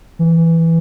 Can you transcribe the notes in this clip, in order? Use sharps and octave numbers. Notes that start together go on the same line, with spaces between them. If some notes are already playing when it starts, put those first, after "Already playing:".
E3